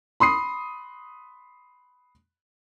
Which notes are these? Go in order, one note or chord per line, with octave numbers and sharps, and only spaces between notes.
B5 C6 D#6 C7